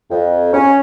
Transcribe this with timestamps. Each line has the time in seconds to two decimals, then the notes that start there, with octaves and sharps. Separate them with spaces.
0.10 F2
0.53 C#4